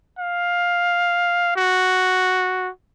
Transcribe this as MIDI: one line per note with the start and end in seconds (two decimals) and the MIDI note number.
0.19 1.51 77
1.56 2.69 66